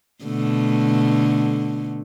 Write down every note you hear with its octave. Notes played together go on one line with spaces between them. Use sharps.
B2 D3 A3